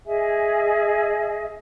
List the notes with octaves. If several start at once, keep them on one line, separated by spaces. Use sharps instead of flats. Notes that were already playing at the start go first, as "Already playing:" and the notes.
G#4 D#5 E5 G#5